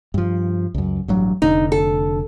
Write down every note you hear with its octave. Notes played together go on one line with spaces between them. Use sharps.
G2 F3
C#2 F#2
A1 G2 F#3
F1 D3 D#4
A4